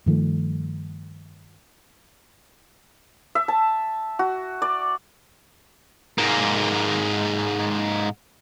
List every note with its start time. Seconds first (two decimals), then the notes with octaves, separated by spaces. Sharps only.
0.06 G2 D#3 F3 A3
3.35 E5
3.48 A5
4.19 F#4
4.62 D5
6.18 G#2 A#3